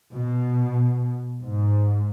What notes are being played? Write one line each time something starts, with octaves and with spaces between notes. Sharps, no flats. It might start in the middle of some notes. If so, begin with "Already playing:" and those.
B2
G#2